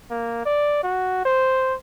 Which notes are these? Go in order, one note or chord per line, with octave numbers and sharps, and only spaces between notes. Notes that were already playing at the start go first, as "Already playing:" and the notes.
A#3
D5
F#4
C5